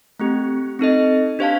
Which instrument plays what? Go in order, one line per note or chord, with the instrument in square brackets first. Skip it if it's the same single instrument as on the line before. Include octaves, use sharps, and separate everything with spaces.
[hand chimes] A3 C4 G4
C4 D#4 A4 D#5
D4 G4 C5 F5 A5